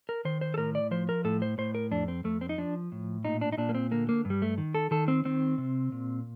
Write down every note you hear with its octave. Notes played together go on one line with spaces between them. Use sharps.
A#4
D#3 C5
C5
A4
A2 A#4
D5
F3 C5
A#4
A2 A4
C5
A2 C5
A#4
F2 D4
C4
F2 A3
C4
D#4
F3 D4
A2
A#2 D#4
D4
D#4
A#2 D4
A#3
C4
D3 A#3
A#3
G2
G3
A3
D#3
A4
D#3 A4
C4
D#3 C4
C3
A#2